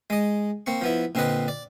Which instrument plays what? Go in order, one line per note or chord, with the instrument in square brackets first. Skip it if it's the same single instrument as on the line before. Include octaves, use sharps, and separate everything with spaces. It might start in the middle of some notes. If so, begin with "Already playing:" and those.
[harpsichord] G#3 D#5
A#3 C4 C#6
F3 B3 E4
A#2 D3 C4 B4 D#5
D5